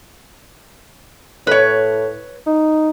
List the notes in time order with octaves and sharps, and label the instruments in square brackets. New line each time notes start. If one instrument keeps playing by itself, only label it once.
[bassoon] A2 [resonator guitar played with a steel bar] B4 C#5
[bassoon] D#4